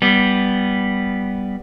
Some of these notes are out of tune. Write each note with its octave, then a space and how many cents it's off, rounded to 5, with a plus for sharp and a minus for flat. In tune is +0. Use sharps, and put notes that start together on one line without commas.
G3 +0 B3 +0